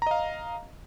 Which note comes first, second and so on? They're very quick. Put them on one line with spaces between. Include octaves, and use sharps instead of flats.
A#5 D#5 F5